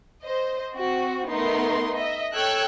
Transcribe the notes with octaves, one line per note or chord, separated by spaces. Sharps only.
C5 D#5
C4 F#4
A3 B3 D#4 A#4 C6
D#5 E5
A4 C#5 G5 E6 F#6 G#6